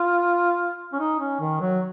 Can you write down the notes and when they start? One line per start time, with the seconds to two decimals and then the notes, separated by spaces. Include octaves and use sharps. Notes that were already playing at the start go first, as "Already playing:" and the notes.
Already playing: F4
0.92 C#4
0.99 D#4
1.19 C#4
1.40 D#3
1.61 F#3